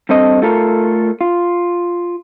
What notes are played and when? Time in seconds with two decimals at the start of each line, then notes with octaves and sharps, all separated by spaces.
0.09 G2 C4 A4 D#5
0.42 A3 F4 A4 A#4
1.21 F4